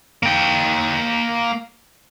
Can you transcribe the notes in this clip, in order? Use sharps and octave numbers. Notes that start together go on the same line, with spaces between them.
A#3 G5